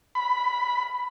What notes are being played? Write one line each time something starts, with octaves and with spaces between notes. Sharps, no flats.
B5